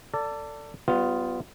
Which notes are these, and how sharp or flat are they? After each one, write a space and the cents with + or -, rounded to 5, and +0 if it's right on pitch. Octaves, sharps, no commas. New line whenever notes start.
A4 +25 D5 -10
G3 -20 B3 +20 F4 +0